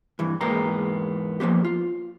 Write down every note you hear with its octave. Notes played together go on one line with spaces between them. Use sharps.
G2 E3
E2 G#2 A#3 B3 G4 A#5
F3 A#3 B3 G4
F4